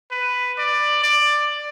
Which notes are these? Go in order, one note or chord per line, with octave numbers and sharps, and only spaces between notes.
B4
D5
D5